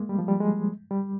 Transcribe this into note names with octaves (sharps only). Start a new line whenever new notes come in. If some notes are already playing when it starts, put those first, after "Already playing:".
Already playing: G#3 A#3
G3
F3
G3
G#3
G3